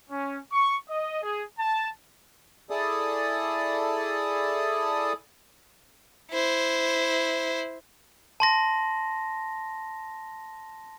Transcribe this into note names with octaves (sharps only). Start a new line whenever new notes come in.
C#4
C#6
D#5
G#4
A5
E4 G#4 A4 D5 A5 D#6
E4 C5
A5 C6 A#6